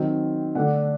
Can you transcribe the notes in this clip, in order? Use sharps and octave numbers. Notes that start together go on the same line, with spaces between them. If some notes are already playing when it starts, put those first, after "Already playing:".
Already playing: D#3 F#3 C4
D3 A3 D4 F#5